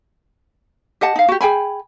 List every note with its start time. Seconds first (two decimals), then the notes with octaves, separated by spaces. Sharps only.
1.01 G4 D#5 F#5 A5
1.16 D#4 F5
1.28 F#4 G4
1.41 G#4 G5 G#5 B5